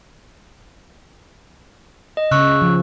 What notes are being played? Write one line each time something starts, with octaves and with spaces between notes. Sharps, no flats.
D#5
C#3 C#6 E6 F#6
F3